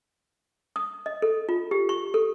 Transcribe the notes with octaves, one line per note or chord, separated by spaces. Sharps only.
D#6
D#5
A4
F4
G4
C#6
A4